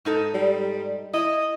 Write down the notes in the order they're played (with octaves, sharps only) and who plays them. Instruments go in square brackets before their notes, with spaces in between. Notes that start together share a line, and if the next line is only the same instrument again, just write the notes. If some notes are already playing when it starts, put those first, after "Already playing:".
[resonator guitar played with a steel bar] G#2 D#4 A4
[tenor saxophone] G3
[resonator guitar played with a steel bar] E4 [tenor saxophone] D#5